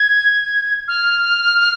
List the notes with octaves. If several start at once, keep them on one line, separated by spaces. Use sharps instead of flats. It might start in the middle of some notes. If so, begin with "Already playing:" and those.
Already playing: G#6
F6